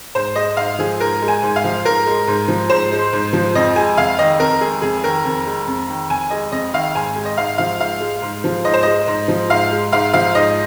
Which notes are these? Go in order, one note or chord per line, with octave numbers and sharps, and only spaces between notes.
G#2 C5
G#3 D#5
G#2 F5
F3 G#4
G#2 A#4
G#3
G#5
G#2
F5
F3
G#2 A#4
G#3
G#2
F3
G#2 C5
G#3
G#2
F3
F2 D#5
G#3 G#5
F2 F5
D#3 D#5
F2 A#4
G#3 G#4
F2 G#4
D#3 A#4
F2
G#3
F2
D#3
F2 G#5
G#3 D#5
F2 D#5
D#3 F5
G#2 G#5
G#3
D#5
G#2 F5
F3 F5
G#2 F5
G#3
G#2
F3
G#2 D#5
C5
G#3 D#5
G#2
F3
G#2 F5
G#3
G#2 F5
F3 F5
G#2 D#5